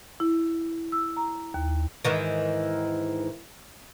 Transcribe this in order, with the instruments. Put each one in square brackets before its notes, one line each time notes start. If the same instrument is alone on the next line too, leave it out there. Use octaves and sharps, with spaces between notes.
[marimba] E4
E6
A#5
D#2
[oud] G#2 D#3 E3